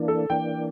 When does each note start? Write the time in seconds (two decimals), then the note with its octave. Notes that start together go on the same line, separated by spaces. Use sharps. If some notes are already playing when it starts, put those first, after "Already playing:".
Already playing: E3 A#3 D4
0.08 A4
0.30 E3 A#3 D4 G5